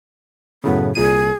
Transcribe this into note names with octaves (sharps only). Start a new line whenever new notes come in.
F#2 A2 C#3 B3
C2 A#2 G#4 D#7